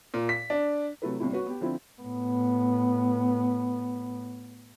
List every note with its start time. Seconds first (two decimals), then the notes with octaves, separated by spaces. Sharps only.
0.14 A#2
0.29 B6
0.50 D4
1.02 C3 F#3 A3 E4 A4 B4
1.20 G1 C2 A#2 G3 E4
1.32 F#4 B4 C#5
1.46 B3 G4
1.60 D3 F3 C4 E4
2.01 A2 B3